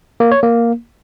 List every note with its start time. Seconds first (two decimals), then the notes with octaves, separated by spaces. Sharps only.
0.20 A#3
0.32 C#5
0.43 A#3